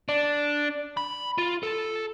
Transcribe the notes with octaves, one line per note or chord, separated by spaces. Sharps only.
D4
B5
F4
A4